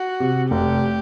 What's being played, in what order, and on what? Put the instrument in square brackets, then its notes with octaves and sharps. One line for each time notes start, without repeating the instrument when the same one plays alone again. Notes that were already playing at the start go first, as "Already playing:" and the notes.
Already playing: [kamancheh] F#4
[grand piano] C3
[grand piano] F1 [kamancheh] G4